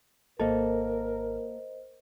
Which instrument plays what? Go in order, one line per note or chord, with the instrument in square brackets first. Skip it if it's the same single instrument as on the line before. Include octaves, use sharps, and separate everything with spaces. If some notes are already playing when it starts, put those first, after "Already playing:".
[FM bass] G#1 [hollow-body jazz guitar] A#3 A4 [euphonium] A#4 [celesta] C5 D#5